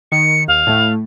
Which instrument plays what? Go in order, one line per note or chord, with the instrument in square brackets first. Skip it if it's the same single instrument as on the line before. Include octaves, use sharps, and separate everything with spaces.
[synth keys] D#3 [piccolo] C#7
[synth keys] D#2 [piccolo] F5
[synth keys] A2 A3